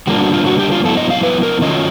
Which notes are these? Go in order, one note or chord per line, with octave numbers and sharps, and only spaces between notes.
D3 G3 A#3 D4 F4 F#4
F#4
F4
F#4
G4
F4
F#3 B3 E4 A4
D#5
F5
B4
A#4
D#3 F#3 A3 C#4 F4 D#5